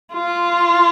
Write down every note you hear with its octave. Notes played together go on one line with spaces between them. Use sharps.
F4